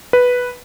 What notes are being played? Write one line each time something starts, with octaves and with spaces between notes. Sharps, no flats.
B4